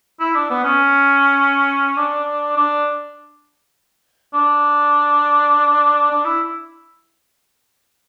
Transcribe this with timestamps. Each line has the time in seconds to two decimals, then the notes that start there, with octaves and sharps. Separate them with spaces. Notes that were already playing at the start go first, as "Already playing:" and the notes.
0.20 E4
0.35 D4
0.50 B3
0.64 C#4
1.97 D4
2.56 D4
4.34 D4
6.11 D4
6.25 E4